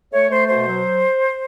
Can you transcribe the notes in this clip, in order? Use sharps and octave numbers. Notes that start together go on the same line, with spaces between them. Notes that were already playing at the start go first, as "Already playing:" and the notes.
A3 C#5
A3 C5
B2 C5
F#3